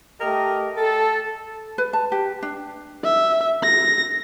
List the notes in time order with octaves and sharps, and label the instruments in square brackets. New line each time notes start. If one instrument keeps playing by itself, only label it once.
[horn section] A3 G4 A#4 D#5
A4
[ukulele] B4
A5
G4
D4
[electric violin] E5
A#6